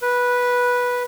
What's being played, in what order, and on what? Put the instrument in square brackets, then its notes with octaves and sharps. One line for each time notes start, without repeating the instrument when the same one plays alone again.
[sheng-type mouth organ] B4